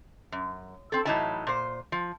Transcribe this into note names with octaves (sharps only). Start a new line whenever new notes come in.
F#2
C4 A4
A2 E3 F#3 D#4 E4 A5
A#2 C5
F3